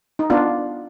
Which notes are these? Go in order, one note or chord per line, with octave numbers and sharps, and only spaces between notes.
D#4
B3 D4 F4